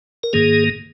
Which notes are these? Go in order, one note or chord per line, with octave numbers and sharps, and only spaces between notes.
A#4
G#2 D#3 A#3 G#4